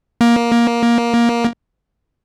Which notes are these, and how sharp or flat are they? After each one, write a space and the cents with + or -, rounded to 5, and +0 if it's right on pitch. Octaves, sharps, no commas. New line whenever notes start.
A#3 +15